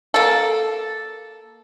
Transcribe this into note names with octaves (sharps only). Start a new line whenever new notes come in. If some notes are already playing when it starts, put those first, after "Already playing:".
A#3 A4